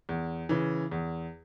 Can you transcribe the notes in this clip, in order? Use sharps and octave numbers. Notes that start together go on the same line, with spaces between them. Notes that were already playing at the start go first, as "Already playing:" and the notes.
E2
C#3 E3
E2